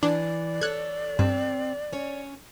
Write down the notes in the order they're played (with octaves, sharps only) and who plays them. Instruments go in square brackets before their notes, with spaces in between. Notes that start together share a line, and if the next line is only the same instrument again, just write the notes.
[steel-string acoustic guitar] E3 [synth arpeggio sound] D4 [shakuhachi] D5
[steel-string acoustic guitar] A4 C#5 [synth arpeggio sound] F#6 G#6
[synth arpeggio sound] G2 [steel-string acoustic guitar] C4
[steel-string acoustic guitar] C#4 C#5